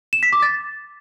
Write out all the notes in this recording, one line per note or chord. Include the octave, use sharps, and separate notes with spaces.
E7
B6
D6
A6